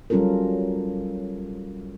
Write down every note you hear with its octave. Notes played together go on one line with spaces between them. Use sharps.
F#3 G3 C#4 F4 A4 A#4